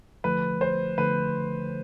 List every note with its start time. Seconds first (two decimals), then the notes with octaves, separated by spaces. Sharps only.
0.24 D3 F3 A3 B4
0.61 C5
0.97 D3 F3 A3 B4